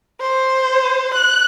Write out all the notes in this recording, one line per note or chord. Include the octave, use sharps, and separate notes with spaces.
C5
F#6